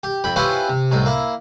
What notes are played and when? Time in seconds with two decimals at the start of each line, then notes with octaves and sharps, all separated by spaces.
0.03 G4
0.24 F2 G5 B5
0.36 C#4 E4 F4 G4 B4 C5
0.69 C3
0.91 C2 A2 D#4
1.06 A#3 E4